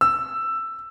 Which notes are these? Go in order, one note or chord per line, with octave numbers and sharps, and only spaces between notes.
E6